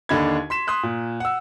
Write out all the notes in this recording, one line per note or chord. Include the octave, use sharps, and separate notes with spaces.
D#2 D3 D4 D#5 B5 G#6
C6 B6 E7
C6 D#6 F#6 B6
A#2
F#5 E6